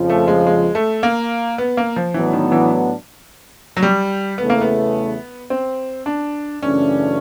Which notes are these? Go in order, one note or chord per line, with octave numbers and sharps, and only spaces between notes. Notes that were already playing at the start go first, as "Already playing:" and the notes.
Already playing: F2 C#3 F3
A3
G#3
G#3
A3
A#3
B3
A#3
F3
A2 E3 F#3 B3 D4
D#3
E3
F#3
G3
E2 C#3 E3 A3 B3
A#3
B3
C4
D4
F#2 C#3 E3 A3 C#4 D4